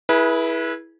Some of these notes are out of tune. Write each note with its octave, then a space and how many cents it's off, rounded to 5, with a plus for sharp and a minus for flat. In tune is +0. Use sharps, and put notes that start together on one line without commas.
E4 +0 G#4 +20 B4 -30